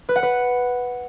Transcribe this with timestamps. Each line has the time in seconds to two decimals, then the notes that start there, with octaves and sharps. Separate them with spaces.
0.09 B4
0.16 F#5
0.23 B4